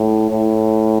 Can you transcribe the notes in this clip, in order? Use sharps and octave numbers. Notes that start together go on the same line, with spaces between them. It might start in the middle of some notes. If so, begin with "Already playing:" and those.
Already playing: A2
A2